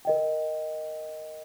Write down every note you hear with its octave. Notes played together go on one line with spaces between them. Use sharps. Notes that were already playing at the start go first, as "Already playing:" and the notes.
A#4 D#5 G5